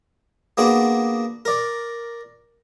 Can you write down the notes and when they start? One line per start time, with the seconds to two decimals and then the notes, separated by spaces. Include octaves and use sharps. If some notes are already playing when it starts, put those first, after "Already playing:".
0.57 A#3 B3 D4 F#4 G#4
1.45 A#4 D5